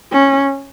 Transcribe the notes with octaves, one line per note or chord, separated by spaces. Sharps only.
C#4